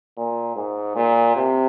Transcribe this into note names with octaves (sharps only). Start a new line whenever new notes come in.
A#2
G#2
A#2
C3